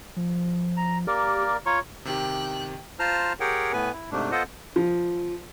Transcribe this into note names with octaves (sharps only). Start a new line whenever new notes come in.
F3
A#5
A#3 G4 A#4 D5
F4 C#5 A#5 C#6
C3 D#3 G4 G5 F#6
F4 C5 A5 A#5 F6
G4 G#4 A#4 C#5 F#5 G5
A2 B3 B4 G#5
E4
G#2 C3 A3 D4
B3 F4 A4 C5 D#5 F#5
F3